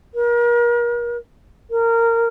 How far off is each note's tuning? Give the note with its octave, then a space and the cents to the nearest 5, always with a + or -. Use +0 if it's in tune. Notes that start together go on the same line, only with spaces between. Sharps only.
A#4 +35
A#4 -20